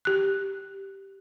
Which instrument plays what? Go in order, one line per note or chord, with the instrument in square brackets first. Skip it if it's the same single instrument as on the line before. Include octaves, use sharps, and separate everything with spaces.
[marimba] G4 F#6